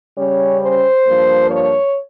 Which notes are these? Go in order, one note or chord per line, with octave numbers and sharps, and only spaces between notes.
C#3 G3 C#4 C#5
C5
G2 F3 A#3
C#5